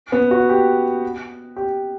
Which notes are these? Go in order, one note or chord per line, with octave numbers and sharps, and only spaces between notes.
B3
F#4
G4
G4